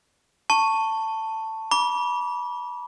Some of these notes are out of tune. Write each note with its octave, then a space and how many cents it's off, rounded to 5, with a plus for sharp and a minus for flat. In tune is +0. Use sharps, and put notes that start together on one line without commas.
A5 +10 C#6 +0
B5 -30 D6 -30